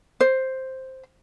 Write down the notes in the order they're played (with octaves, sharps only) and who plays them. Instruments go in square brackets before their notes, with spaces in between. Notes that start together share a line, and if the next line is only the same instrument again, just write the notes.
[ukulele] C5